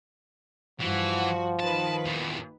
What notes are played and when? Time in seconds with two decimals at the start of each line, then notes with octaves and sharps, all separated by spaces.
0.80 G2 E3 F3 F#4
1.60 D#3 B4 A5
2.06 E2 A#2